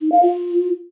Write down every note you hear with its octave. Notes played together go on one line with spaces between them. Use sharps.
D#4
F5
F4